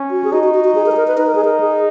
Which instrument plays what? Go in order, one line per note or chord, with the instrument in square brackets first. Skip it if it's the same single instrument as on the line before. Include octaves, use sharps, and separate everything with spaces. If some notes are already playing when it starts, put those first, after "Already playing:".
Already playing: [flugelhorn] C#4
[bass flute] F#4
G#4
[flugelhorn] D#4 [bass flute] F#4
[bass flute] F#4
F#4
F#4
G#4
A#4
G#4
A#4
B4
[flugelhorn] D#4 [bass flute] B4
[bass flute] A#4
G#4
A#4
G#4